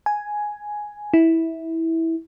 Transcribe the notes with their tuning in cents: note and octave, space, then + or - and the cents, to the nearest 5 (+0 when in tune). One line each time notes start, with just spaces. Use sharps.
G#5 +5
E4 -15